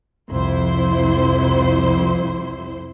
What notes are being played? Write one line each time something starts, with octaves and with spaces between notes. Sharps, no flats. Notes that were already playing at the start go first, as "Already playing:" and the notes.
C2 F2 F3 E4 C5 C6